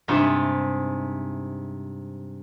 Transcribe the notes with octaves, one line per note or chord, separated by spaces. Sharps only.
G2 C3 G#3 D#4 F4 E5